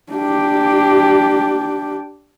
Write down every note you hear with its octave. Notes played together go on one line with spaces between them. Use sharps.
D4 G4